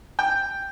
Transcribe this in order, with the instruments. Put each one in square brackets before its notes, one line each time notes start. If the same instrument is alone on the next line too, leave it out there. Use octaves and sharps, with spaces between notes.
[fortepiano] G5